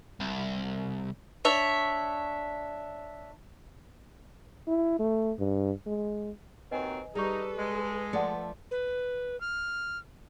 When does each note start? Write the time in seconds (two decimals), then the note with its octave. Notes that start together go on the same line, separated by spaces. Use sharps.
0.20 C2
1.45 D4 C#5 E5
4.67 E4
4.99 A3
5.39 G2
5.86 G#3
6.71 D#2 F#3 C4 B4 D#5 G#5
7.15 G3 D#4 G#4 A4 B4 C#6
7.58 G#3
8.13 F3 A3 D5 F#5 C#7
8.71 B4
9.41 F6